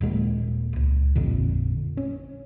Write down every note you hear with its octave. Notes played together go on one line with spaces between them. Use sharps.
D#1 A#2 G#3 A#3
C#2
A1 F2 A#2 D3
C#4